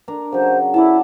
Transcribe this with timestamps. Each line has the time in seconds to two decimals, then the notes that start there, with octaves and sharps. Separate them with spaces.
0.08 D4 A#4 A#5
0.32 C#3 F#3 C5
0.74 E4 D5 F#5 A5